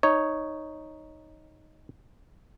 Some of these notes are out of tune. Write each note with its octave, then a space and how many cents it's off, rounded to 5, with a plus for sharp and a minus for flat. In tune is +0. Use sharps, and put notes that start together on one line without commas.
D#4 +0 C#5 +0